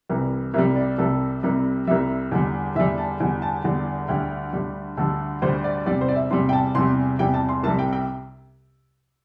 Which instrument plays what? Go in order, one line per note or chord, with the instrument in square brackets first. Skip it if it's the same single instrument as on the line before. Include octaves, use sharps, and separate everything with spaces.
[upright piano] C2 C3 E3 G3
C2 C3 G3 E5
D5
C2 C3 G3 A4
C2 C3 G3
C2 C3 G3 E5
E2 D3 G3
E2 D3 G3 E5
A5
E2 D3 G3
A5
E2 D3 G3
D2 D3 G3 G5
D2 D3 G3
D2 D3 G3 A4
D2 D3 G3 C5
D5
E2 C3 G3 D5
C5
D5
E5
E2 C3 G3 C6
G5
A5
E2 C3 G3 C6
E2 C3 G3 G5
A5
C6
C2 C3 G3 A5
G5
G5